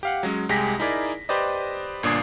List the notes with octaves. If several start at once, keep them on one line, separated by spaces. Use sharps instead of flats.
G4 F5 F#5
F#3 G#3 C#4
C2 G#3 G4 G#4 A#6 B6
D#4 E4 G#4 A#4 D5
G4 B4 C5 D5 D#5
G1 A#2 D4 D#6 G#6 C7